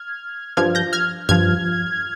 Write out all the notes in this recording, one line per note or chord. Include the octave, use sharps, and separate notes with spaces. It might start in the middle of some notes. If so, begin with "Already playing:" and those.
Already playing: F6 G#6
G2 F3 F6 G#6
G6 A#6
F6 G#6
G2 F3 F6 G#6